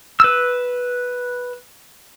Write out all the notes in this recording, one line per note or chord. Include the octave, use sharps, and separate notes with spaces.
B4 E6